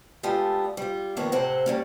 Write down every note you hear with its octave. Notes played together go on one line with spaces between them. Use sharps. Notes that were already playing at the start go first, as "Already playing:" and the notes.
G#3 A3 B3 D4 F4 G4
G3 F4
F2 D#3 A#3 B3 C#5
A2 C3 C4 C5 F#5
G3 A#3 C#4